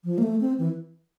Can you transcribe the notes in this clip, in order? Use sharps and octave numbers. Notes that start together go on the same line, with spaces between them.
F3
A#3
A3
C4
E3